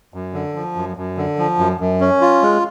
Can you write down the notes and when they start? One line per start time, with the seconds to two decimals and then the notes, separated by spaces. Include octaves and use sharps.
0.14 F#2
0.34 D3
0.55 F3
0.76 F#2
0.97 F#2
1.17 D3
1.39 F3
1.59 F#2
1.80 F#2
2.00 C#4
2.21 F4
2.42 G#3